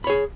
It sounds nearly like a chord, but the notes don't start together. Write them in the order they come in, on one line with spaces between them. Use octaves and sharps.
B5 C#5 G#4